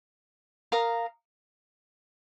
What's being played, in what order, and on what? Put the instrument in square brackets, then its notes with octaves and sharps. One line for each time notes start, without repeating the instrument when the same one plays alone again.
[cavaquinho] A#4 F5 A#5 D#6